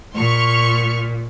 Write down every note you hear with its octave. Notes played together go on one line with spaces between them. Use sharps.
A#2 C6 C#6 F6